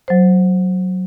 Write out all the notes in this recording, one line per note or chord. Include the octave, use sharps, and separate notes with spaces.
F#3 C5